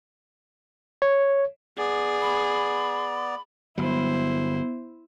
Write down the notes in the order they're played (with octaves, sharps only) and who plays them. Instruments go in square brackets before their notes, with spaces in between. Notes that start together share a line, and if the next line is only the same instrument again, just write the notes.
[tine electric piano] C#5
[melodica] B3 D5 [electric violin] G#4
[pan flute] B5
[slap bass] G1 F#3 [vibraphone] B3 [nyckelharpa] E4 C5